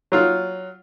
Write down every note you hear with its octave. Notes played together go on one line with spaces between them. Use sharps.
F#3 F4